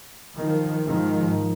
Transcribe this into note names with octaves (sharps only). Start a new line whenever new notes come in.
D#3 F3
G#2 D#3 F3